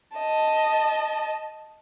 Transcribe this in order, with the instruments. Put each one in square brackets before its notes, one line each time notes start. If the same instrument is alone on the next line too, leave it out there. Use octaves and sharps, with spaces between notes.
[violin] D#5 A5